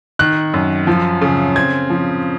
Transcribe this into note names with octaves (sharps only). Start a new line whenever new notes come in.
D#3 F#6
F#2
F3
C#3
C4 G#6
F3